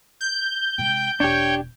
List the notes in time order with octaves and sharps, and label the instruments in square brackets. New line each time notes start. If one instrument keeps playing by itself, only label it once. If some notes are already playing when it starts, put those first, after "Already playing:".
[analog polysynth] G6
[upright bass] C3 G#3 [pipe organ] G5
[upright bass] E1 [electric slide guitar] D4 G4 [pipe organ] C#5 G5